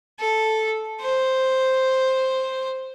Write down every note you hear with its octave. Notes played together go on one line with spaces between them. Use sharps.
A4
C5